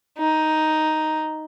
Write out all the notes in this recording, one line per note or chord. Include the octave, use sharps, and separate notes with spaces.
D#4